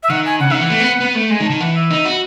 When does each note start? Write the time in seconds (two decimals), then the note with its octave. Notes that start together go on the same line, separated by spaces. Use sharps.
0.03 E5
0.10 D#3 F#5
0.26 G#5
0.40 C#3 F#5
0.50 D#3 E5
0.55 E3 F#5
0.70 A3
0.80 B3
1.00 B3
1.15 A3
1.30 G#3 G#5
1.40 D#3
1.45 A5
1.50 D#3
1.60 E3 F#5
1.75 E5
1.90 D#4
2.05 F#4